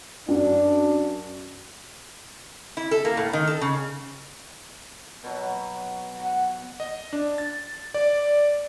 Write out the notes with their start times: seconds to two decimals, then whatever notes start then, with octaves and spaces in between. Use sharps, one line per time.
0.28 F#2 D4
2.77 E4
2.91 A4
3.05 A#3
3.17 A2
3.33 D#3
3.47 A4
3.61 C#3
5.23 B2 F#3
6.16 F#5
6.80 D#5
7.13 D4
7.38 A6
7.94 D5